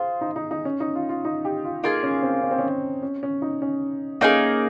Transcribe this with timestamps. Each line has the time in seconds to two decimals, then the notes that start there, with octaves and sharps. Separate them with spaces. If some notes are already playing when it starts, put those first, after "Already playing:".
Already playing: F4 G#4 C5
0.21 D#4
0.36 D#4
0.51 D#4
0.65 C#4
0.80 D#4
0.95 F4
1.09 F4
1.25 D#4
1.45 G4
1.65 F4
1.84 A#3 D#4 F4 G#4
2.03 C#4
2.23 C4
2.43 C#4
2.51 C4
2.59 C#4
3.03 C#4
3.23 C#4
3.42 D#4
3.62 C#4
4.21 A#3 C#4 D#4 G#4